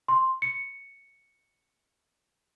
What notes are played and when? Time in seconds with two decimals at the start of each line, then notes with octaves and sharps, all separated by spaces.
0.08 C6
0.42 C#7